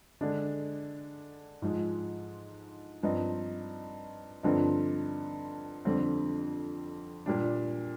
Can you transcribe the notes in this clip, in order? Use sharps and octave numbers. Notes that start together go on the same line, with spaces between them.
D3 G#3 D4
G#2 F3 G#3
G2 F3 C4 D#4
G2 D3 F3 C4 D#4
F2 D3 G3 C4
A#2 G3 D4